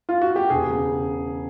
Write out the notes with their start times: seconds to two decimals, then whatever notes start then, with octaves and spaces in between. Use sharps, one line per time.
0.09 F4
0.22 F#4
0.36 G4
0.50 E1 G#4
0.69 C#3